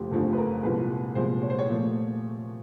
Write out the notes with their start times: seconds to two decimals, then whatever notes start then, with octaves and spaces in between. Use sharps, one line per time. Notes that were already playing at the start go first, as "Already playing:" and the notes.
Already playing: F#1 F2 F3 A3 G4
0.11 F#1 F2 D3 F3 A3 A4
0.33 B4
0.37 A#4
0.63 C2 A#2 F3 G#3 B4
1.15 C2 A#2 F3 G#3 C5
1.42 C#5
1.50 C5
1.59 C#5
1.69 A#2 F3 A3